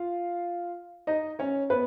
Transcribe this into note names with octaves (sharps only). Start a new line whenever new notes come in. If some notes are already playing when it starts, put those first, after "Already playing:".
Already playing: F4 F5
D#4 D#5
C#4 C#5
B3 B4